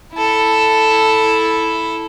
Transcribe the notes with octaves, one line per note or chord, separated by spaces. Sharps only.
E4 A4